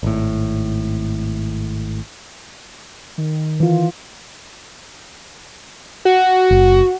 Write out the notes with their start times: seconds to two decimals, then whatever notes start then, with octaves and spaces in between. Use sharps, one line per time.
0.03 G#1 A2
3.18 D#3
3.60 E3 F4
6.05 F#4
6.51 F#1